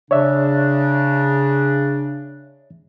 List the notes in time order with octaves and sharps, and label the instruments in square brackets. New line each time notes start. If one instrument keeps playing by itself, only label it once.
[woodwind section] C#3 D4 [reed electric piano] C#5 D5 E5